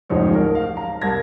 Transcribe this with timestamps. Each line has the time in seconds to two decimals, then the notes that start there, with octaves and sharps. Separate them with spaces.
0.09 D1 A1 G#2 F3 D#4 C#5
0.35 A#4
0.55 F5
0.77 A#5
1.02 C2 A#4 A5 G#6 A#6